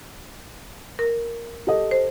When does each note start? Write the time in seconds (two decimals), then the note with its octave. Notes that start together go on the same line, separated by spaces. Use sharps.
0.99 A#4
1.67 G4 A4 D#5
1.91 C5